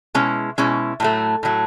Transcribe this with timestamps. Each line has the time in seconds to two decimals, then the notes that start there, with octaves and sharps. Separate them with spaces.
0.15 B2 G#3 C#4 E4
0.58 B2 G#3 C#4 E4
1.00 A2 F#3 A3
1.43 A2 F#3 A3